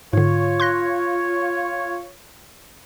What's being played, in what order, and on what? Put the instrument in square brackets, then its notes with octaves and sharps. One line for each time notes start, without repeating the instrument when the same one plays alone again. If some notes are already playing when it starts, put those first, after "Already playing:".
[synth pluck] G#2 D3 [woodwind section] F4 C#5
[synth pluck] C6 F#6 A#6